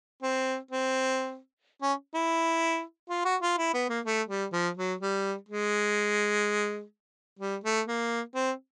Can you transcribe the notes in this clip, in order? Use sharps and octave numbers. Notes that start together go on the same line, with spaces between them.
C4
C4
C#4
E4
F4
F#4
F4
E4
B3
A#3
A3
G3
F3
F#3
G3
G#3
G3
A3
A#3
C4